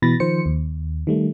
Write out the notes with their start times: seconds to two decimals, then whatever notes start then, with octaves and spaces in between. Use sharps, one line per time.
0.02 B2 E3 B5 A6 A#6
0.20 D#3 F3 C5 C#7
0.46 D#2
1.07 D#3 G3 A3